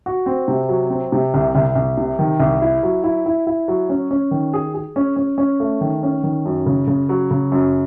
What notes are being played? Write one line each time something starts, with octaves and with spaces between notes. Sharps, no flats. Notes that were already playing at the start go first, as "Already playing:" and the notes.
F#4
C4
C3
F#3
C4
C3
C2
C2
C2
C3
D#3
C2
E4
F#3
E4
E4
E4
F#3
C#4
C#4
D#3
G#4
G#4
C#4
C#4
C#4
A3
D#3
C#4
D#3
F#2
C#3
C#3
F#3
C#3
F#2